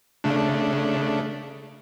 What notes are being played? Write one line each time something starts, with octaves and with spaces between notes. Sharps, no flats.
C#3 A3 D4